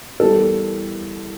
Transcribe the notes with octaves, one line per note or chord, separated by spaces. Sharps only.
E2 E3 G3 A4